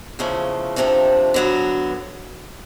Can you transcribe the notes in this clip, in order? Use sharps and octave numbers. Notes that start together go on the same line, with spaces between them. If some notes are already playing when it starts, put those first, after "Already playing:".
E2 C#3 F3 A3
F2 C3 F3 A3 D4
D3 F#3 B3